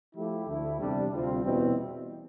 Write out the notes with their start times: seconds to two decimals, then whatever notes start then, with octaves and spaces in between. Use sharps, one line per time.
0.15 F3 A3 E4 G4
0.47 D2 D3 A3 E4
0.79 E2 C3 G3 D4
1.11 D2 C3 G3 C4 F4
1.43 E2 B2 G3 C4 E4